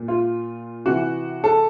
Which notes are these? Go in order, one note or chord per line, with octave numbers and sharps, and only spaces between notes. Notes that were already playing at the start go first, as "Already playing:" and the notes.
Already playing: A#2
F4
C3 E3 F#4
A4